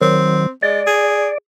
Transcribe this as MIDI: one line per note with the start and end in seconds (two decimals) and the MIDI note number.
0.01 0.46 51
0.01 0.46 54
0.01 0.51 60
0.63 0.82 56
0.63 1.38 74
0.87 1.30 68